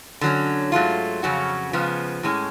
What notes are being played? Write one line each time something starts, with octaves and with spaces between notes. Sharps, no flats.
D3 F#3 C#4
G#2 F#3 A3 F4
F2 C#3 F#3 C#4 F#4
C#3 F3 G#3 B3
A2 G#3 C#4